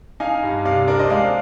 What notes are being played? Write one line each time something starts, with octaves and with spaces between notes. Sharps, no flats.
D#4 F5 G#5
G2
C3 D5 F5
D4 A#4 D5
C5 D#5
G#3 D5 F5